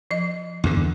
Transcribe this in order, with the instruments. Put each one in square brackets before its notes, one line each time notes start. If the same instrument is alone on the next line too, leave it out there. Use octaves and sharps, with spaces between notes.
[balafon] F3 D#5
[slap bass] E2 G2 D3